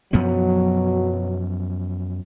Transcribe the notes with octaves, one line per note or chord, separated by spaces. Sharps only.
F#2 B2 F3 F#3 B3